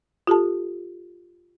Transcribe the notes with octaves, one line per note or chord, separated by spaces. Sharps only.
F4 G4 A4 A5